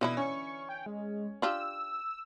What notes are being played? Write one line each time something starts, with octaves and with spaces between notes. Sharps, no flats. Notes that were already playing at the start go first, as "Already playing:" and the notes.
B2 D3 E3 E4
C#4 C#6
G5
G#3
D4 F4 G4 E6